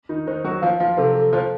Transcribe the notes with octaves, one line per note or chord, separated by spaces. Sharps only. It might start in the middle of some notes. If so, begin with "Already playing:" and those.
D#3 D#4 F4
D#3 D#4 C5
F#3 F#4 C5
F3 F4 F5
F3 F4 F5
C3 C4 A4
A4
F3 F4 C5